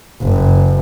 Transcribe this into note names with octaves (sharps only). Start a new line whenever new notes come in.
F#1